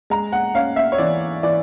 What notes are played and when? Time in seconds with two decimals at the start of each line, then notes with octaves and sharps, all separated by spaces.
0.10 G#3 A#5
0.33 F#5
0.54 C#4 F5
0.76 E5
0.92 C#5
0.98 E3 D5
1.43 E3 D5